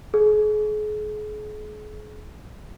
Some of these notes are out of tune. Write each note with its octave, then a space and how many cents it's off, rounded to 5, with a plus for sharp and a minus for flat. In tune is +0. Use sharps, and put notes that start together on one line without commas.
G#4 +35